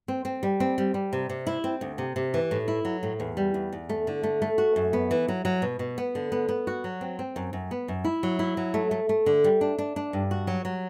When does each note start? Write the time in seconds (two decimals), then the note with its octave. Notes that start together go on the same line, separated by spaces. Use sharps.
0.08 C4
0.25 C4
0.43 G3
0.60 C4
0.78 G3
0.94 G3
1.13 C3
1.30 C3
1.47 E4
1.64 C4
1.81 D2
1.98 C3
2.16 C3
2.34 E3
2.51 A2
2.68 E4
2.85 F#3
3.03 A2
3.20 E2
3.37 G3
3.54 E2
3.73 E2
3.89 A3
4.07 D3
4.23 A3
4.42 A3
4.58 F#4
4.76 F#2
4.93 B3
5.11 E3
5.28 F#3
5.45 F#3
5.62 B2
5.79 B2
5.98 B3
6.15 D3
6.32 B3
6.49 B3
6.67 F#4
6.84 F#3
7.01 C4
7.19 C4
7.36 F#2
7.53 F#2
7.71 B3
7.88 F#2
8.04 E4
8.23 F#3
8.39 E4
8.57 F#3
8.74 A3
8.91 A3
9.09 A3
9.26 D3
9.44 G3
9.61 D4
9.78 D4
9.96 D4
10.13 G2
10.31 F#4
10.47 F#3
10.65 F#3